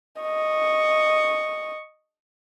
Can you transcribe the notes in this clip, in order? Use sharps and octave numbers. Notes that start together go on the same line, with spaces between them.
D#5 C#6